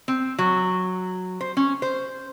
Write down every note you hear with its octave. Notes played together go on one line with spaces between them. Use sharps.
C4
F#3
C5
C#4
C5